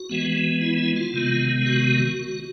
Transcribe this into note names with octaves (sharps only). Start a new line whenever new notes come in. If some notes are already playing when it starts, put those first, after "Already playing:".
Already playing: F#4
E3 G#3 B3
E4
E4
F4
C3 D#3 G#3 B3
F#4